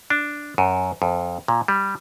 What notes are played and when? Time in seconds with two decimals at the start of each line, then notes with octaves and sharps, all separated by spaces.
0.10 D4
0.58 F#2
1.02 F2
1.48 A#2
1.68 G3